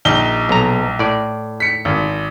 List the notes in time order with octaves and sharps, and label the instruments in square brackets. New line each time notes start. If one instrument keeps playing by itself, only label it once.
[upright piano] A#1 D#4 G7
[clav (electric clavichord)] B1 A#5
A2 D5
[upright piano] B6 C#7
G#1